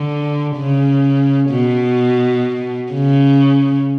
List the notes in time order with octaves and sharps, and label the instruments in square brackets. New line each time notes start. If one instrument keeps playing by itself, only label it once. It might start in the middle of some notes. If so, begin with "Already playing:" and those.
Already playing: [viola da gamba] D3
C#3
B2
C#3